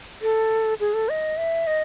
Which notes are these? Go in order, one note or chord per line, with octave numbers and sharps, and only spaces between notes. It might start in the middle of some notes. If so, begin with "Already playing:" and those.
A4
G#4
A4
D#5
E5
D#5